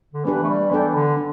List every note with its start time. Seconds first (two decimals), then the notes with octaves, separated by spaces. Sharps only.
0.14 D3
0.25 E3 B3 D4 G4 B4
0.44 A3
0.49 G3
0.71 E3 B3 D4 A4 D5 G5
0.95 D3
1.17 D4